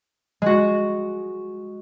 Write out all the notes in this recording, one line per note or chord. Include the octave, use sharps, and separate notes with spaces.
G#3 F#4